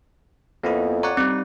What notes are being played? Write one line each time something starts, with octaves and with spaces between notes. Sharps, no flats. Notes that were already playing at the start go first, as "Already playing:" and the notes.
F2 A#3 B3 E4
C#5 D5 F#5 A#5
G3 C4 D#4